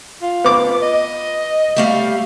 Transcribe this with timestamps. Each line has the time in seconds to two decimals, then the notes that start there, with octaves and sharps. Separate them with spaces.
0.22 F4
0.44 B3 D6
0.82 D#5
1.76 G3 A3 F5